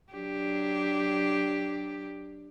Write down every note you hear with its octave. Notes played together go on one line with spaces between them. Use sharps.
F#3 D4 G4